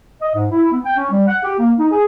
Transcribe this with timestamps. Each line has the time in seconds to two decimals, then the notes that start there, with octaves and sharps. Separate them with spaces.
0.22 D#5
0.35 G#2
0.52 E4
0.72 B3
0.85 G5
0.97 C#4
1.10 G3
1.28 F#5
1.43 G4
1.59 A#3
1.79 D#4
1.92 G#4